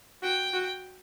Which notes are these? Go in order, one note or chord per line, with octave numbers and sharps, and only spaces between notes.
F#4 G5
F#4